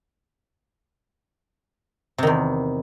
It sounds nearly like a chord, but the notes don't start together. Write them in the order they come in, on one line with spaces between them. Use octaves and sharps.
C3 D#3 E2